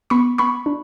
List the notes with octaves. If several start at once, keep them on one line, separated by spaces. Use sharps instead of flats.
B3 B5 C#6
B3 B5 C#6
D4